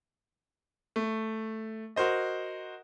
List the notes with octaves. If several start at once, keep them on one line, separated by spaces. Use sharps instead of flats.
A3
F#4 A#4 C5 D#5